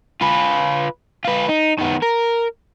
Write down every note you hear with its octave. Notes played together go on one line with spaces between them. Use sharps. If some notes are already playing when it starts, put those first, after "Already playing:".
F4 B4
F4 B4
D#4
D#3 B3
A#4